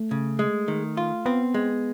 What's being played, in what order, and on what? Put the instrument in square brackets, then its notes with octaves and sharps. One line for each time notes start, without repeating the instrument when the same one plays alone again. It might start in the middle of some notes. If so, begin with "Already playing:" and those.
Already playing: [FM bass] A3
[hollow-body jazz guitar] C#3
G#3
D#3
F4
[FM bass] B3 [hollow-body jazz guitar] C4
[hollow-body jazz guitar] G#3